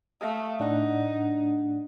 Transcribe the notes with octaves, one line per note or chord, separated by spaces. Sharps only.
A3 F5 D#6
A2 D4 D#4 F#5